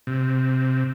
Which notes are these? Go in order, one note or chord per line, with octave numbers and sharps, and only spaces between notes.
C3